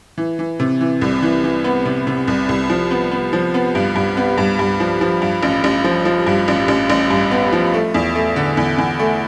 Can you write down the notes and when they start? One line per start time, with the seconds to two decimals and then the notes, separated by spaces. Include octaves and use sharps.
0.18 E3
0.39 E3
0.60 C3
0.81 E3
1.01 C2
1.23 E3
1.44 E3
1.64 B3
1.85 C3
2.07 C3
2.28 C2
2.49 C2
2.70 F3
2.91 B3
3.11 B3
3.33 F3
3.54 B3
3.75 G2
3.96 G2
4.17 B3
4.38 G2
4.59 G2
4.80 F3
5.01 F3
5.22 G2
5.43 A1
5.64 A1
5.84 F3
6.05 F3
6.26 G2
6.48 A1
6.68 A1
6.90 A1
7.10 G2
7.31 B3
7.53 F3
7.74 A3
7.94 E2
8.15 A3
8.36 D3
8.57 E2
8.78 E2
8.99 A3